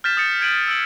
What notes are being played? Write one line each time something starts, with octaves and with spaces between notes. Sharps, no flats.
F6 G6 A6 B6 E7
D#6 A6 C#7
G6 G#6 D7 D#7 F#7
E6 D7 F#7